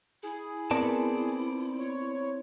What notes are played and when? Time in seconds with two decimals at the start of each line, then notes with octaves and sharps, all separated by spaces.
0.23 E4 G#4
0.71 B3 C4 A#4 D5 A5
1.79 C#5